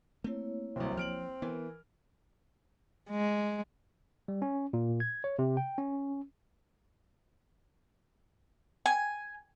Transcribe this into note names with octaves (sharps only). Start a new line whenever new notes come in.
A3 A#3 C4 E4 C#5
D1 C2 C4
F3 F6 D7 F#7
E3 B3 A#4
G#3
G3
C#4
A#2
G#6
C#5
C3
G5
C#4
G#5